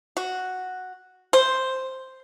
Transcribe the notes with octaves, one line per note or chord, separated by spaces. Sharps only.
F#4
C5